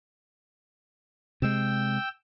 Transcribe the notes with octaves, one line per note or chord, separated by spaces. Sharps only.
C3 G#3 G5 E6